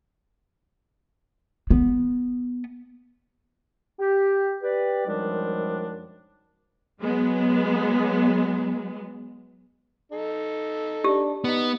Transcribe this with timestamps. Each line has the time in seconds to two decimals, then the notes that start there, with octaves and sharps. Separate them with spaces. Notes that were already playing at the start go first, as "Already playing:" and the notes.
1.70 B3
3.99 G4
4.62 G4 B4 D5
5.07 F#2 D#3 F3 G3 G#3 D4
7.01 F#3 G#3 B3
10.12 D#4 A4
11.04 D4 G4
11.44 B3 D#4